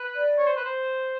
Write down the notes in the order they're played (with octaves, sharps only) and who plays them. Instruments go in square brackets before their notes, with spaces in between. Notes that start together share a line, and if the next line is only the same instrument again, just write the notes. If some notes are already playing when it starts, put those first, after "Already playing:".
Already playing: [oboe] B4
[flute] D5
[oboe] C#5
C5
B4
C5